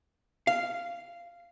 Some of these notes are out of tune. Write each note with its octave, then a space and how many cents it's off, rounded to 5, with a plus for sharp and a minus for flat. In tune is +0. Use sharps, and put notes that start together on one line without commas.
F5 -10